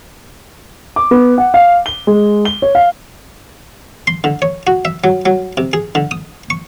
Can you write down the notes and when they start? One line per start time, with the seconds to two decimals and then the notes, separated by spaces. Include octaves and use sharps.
0.96 D6
1.11 B3
1.38 F#5
1.54 F5
1.86 G7
2.07 G#3
2.45 G7
2.62 C#5
2.75 F5
4.07 C6
4.24 D3
4.42 C#5
4.67 F#4
4.85 E5
5.04 F#3
5.26 F#3
5.57 C3
5.73 G#4
5.95 D3
6.11 D#6
6.50 C#6